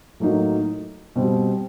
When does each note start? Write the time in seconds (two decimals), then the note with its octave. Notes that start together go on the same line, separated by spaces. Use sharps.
0.20 A2 F#3 A#3 D#4
1.16 B2 G3 C4